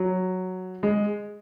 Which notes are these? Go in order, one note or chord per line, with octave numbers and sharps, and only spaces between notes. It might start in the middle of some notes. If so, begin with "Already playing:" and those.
Already playing: F#3
G#3